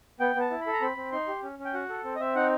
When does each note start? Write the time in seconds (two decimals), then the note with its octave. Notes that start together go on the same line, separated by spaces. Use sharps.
0.20 B3 G5
0.35 B3
0.41 A5
0.51 E4
0.61 B5
0.67 A4
0.73 A#5
0.82 C4 B5
0.96 C4
1.12 D#4 C6
1.28 G4
1.43 C#4
1.59 C#4
1.65 G5
1.74 F#4 F#5
1.89 A4
2.04 C4
2.16 D#5
2.20 C4 E5
2.35 D#4 F#5